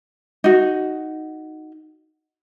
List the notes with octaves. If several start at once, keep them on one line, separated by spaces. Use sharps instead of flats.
D#4 F#4